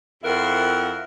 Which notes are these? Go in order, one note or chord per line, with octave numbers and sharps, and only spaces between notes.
F2 E4 A#4 F#5